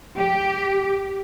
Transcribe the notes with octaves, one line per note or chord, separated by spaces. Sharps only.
G4